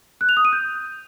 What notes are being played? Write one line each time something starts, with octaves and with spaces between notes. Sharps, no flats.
F#6
F7
D#6
D#7
G6